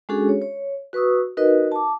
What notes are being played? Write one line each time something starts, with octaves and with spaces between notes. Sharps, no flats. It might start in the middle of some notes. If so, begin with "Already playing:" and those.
G#3 C#4 D4 F#4 G#4 A4
C#5
C#5
F#4 B4 C#6 D#6 E6
D#4 F#4 A#4 B4 D#5
A5 D6